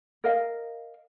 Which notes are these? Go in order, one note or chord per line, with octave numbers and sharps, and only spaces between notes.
A#4 D#5 F5